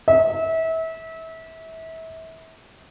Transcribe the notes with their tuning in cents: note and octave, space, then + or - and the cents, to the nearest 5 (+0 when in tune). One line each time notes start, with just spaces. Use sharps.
E5 -30